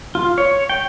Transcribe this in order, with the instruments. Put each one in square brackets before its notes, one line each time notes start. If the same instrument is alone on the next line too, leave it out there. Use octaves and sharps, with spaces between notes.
[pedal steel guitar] F4
C#5
G5